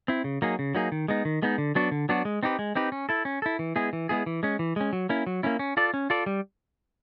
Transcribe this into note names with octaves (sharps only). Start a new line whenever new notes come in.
C4 E4
C#3
F#3 A#3 D#4 G#4
C#3
F#3 A#3 D#4 G#4
D#3
G#3 B3 D#4
D#3
G#3 B3 D#4
D3
F#3 B3 D4 F#4
D3
F#3 B3 D4 F#4
G#3
C4 D#4 G4 B4
G#3
C4 D#4 G4 B4
C#4
E4 A4
C#4
E4 A4
E3
G#3 B3 E4 G#4
E3
G#3 B3 E4 G#4
E3
G#3 C#4
E3
G#3 C#4
F#3
A#3 C#4 E4
F#3
A#3 C#4 E4
C#4
F4 A4 D5
C#4
F4 A4 D5
G3